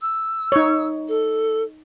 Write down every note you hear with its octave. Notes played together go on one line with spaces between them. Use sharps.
E6
D#4 C#5
A4